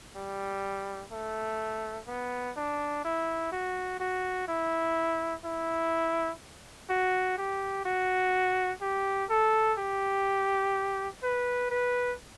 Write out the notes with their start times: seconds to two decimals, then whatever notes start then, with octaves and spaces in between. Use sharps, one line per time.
0.16 G3
1.12 A3
2.08 B3
2.57 D4
3.05 E4
3.52 F#4
4.00 F#4
4.48 E4
5.45 E4
6.90 F#4
7.38 G4
7.85 F#4
8.81 G4
9.30 A4
9.78 G4
11.23 B4
11.71 B4